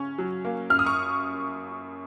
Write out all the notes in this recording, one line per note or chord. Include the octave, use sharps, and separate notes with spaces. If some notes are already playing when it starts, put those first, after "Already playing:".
Already playing: C#3 C#4 C#6
F#3
A#3
F#2 F6
D#6
C#6